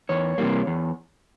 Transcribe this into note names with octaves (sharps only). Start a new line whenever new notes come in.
E2 C#5
C3 E3 G3 A#3
E2